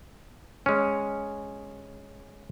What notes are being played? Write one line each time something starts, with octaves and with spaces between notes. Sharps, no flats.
G#3 C#4